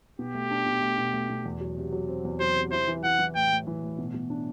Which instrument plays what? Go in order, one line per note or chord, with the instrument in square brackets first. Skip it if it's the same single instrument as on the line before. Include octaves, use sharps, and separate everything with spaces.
[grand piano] B2 [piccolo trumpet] G4
[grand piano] A3
D4
B2
A3
B2
A3
B2
E2
F#3
C3
F#3
C4
E2
[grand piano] F#3 [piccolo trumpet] C5
[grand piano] C3
[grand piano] E4 [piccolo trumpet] C5
[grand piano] E3
[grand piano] E3 [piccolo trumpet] F#5
[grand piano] E3
[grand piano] A2 [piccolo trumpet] G5
[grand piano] A2
E3
A2
B2
B2
D4